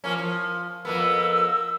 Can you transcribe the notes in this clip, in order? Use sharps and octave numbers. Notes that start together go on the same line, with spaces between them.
F3 A#3 C#4
F3
F2 A#3 B3 E6